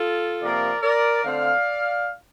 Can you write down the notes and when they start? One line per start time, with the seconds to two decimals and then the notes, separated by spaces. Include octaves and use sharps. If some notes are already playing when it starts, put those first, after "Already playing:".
Already playing: F4 A4
0.42 C3 F3 A#3 A#4 D5
0.83 A#4 D5
1.24 D3 A3 C4 D5 F5